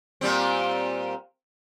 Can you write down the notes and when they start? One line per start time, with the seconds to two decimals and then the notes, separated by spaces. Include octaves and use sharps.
0.21 A#2 G3 C4